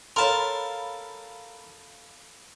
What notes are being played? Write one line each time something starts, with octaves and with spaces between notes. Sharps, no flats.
A4 A#4 C#5 F5 A5 B5 C6